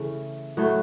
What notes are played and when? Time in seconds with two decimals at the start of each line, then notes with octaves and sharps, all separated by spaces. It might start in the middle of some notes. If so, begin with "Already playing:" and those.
Already playing: C#3 E3 A3
0.57 A2 F#3 A3